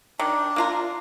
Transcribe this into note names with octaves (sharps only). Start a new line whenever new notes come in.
D#3 D4
A#3 F4 A#4